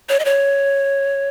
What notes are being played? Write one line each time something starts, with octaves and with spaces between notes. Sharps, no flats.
C#5
D#5
C#5